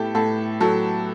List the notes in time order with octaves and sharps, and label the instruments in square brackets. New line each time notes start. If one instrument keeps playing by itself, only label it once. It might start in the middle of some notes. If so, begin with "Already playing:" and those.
Already playing: [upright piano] A2 B3 E4 G4 A4
A2 A4
F#3 A4